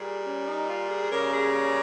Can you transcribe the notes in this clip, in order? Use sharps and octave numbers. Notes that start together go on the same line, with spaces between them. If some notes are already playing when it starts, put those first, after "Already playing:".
Already playing: A#2 G3 G#4
C#4
D#4
F4
G#4
G#4
C#3 G3 A#3 C#4 A#4
G#4
G#4